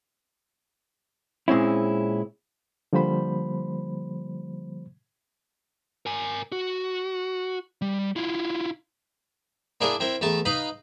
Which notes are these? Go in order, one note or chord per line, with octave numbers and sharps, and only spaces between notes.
A#2 G#3 C4 C#4 E4
D3 F3 G3 A#3 C5 B5
A#4 G#5
F#4
G3
E4 F4
A#3 D4 E4 G#4 A#4
C4 E4 A#4
E2 A3 A5 A#5
D#4 B4 F5 A#5 B5